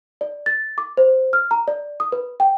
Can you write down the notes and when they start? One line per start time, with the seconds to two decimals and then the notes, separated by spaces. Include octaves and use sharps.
0.21 D5
0.46 A6
0.78 D6
0.97 C5
1.33 F6
1.51 A#5
1.68 D5
2.00 D#6
2.12 B4
2.40 G5